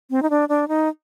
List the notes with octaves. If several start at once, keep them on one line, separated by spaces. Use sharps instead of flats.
C4
D#4
D4
D4
D#4